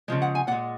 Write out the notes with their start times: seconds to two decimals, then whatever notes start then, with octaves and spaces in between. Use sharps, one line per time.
0.08 C#3 F3 G#3
0.22 F#5
0.35 G#5
0.47 A#2 F#5
0.52 G#3